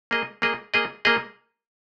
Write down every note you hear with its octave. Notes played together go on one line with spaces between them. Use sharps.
A#3 G#4 D#5
A#3 G#4 D#5
A#3 G#4 D#5
A#3 G#4 D#5